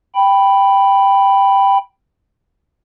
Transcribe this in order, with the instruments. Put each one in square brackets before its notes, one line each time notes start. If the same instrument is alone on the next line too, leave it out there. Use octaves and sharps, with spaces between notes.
[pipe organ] G5 B5